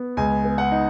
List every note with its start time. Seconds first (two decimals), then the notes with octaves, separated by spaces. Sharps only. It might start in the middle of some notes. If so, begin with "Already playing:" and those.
Already playing: B3
0.17 C#2 G#5
0.44 B3
0.58 F#5
0.72 D#4